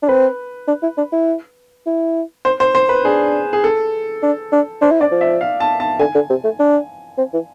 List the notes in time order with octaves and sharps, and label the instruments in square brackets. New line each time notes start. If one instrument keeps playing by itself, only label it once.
[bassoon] D4
[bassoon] C4 [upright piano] B4
[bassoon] D4
E4
D4
E4
E4
[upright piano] C5
C5
C5
B4
[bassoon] D4 [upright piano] G#4
[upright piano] G#4
A4
[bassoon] D4
D4
[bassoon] D4 [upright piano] C5
[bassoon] E4
[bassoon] D4 [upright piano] D5
[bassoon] F3
[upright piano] E5
F5
A5
A5
[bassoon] D3 [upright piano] G#5
[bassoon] D3
C3
A3
D4
C4
E3